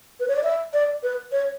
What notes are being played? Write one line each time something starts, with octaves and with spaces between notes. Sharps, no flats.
B4
C#5
D5
E5
D5
B4
C#5